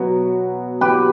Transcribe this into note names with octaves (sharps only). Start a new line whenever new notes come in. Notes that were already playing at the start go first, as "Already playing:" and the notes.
Already playing: B2 F#3 B3
G4 B4